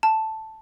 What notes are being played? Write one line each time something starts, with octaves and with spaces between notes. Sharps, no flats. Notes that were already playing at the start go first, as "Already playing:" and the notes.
A5